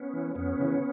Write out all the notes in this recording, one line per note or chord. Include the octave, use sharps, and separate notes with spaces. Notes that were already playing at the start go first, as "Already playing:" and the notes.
Already playing: B3 C#4
E3
F2 B3 C#4
C#3 E3